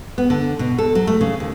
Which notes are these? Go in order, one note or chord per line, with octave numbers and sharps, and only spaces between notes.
B3
D3
B2
A4
F#3
A3
C#3
D#2